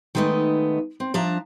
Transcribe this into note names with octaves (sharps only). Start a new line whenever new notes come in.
D#3 G#3 A3 B3 D#4
C4
F3 D4 E5 A5 A#5